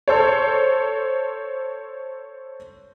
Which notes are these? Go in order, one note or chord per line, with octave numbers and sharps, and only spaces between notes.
A4 C5 C#5